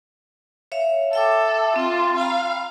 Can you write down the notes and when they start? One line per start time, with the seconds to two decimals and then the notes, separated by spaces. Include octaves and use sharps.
0.72 C#5 E5 F5
1.13 A4 E5 G5 D6
1.76 C4 F4 G5
2.18 F5 G5 A#5 B5